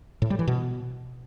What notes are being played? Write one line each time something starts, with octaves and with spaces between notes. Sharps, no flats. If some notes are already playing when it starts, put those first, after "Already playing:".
A2
G3
E3
B2